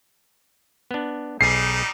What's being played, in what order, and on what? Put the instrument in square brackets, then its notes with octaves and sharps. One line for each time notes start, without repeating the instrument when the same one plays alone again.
[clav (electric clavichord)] B3 D4
[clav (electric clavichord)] B1 G#4 [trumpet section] G3 D#4 [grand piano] C7